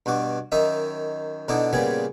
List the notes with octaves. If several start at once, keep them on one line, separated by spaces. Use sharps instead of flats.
G2 B2 F#4 D6
F#2 D#3 D#4 E5 D#6
B2 D3 D#4 E4 D6 D#6
A#2 C#3 G3 B3 G#4